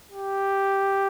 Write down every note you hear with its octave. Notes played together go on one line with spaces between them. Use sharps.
G4